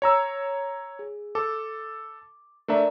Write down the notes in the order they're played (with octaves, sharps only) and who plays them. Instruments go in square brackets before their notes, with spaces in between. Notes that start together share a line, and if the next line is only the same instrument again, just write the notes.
[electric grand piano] C#5 A#5 E6
[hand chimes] G#4
[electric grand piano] A4 [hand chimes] D6
[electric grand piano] A3 D4 E5 [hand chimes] A#4 D5 A#5